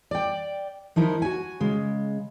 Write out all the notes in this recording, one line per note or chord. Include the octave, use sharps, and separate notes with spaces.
D5 G5
F3 D#4 E4 A#4
F#4 G#5
C#3 G#3